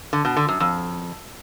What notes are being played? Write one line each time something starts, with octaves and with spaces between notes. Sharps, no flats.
D3
B2
D3
F#2
F2